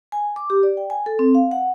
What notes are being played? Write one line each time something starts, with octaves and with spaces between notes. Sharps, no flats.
G#5
D6
G4
D5
G5
G#5
A4
C4
F5
F#5